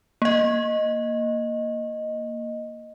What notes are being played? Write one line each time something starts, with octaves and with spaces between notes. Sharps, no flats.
A#3 D#5